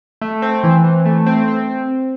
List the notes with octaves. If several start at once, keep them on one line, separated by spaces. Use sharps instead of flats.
A3
C4
E3
E3
A3
C4
C4